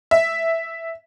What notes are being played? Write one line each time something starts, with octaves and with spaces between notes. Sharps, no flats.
E5